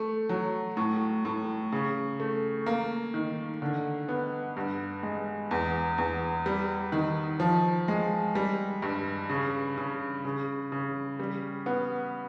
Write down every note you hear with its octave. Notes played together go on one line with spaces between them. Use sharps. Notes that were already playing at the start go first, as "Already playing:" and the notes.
Already playing: A3
F#3
A2
A2
C#3
A3
A#3
D#3
D3
B3
G2
G#3
E2
E2
G3
D#3
F3
G#3
G3
G2
C#3
C#3
C#3
C#3
G3
B3